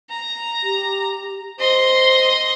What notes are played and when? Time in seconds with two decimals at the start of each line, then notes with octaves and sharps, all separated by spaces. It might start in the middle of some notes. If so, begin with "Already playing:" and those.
0.11 A#5
0.63 G4
1.59 C5 D#5 C6